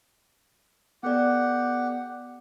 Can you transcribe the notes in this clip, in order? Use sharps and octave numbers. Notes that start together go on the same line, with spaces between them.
B3 G4 A4 D5 F#5